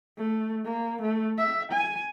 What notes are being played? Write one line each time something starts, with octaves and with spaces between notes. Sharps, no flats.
A3
A#3
A3
E5
G#5